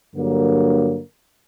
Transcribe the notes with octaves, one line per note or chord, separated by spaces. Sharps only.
G2 D3 F#3 A#3